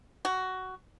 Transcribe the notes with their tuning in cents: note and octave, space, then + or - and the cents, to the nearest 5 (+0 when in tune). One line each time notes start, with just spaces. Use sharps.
F#4 +15